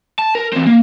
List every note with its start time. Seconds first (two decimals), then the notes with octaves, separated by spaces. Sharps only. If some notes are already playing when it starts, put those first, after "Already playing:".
0.19 A5
0.35 A#4
0.53 E3 C4
0.66 A#3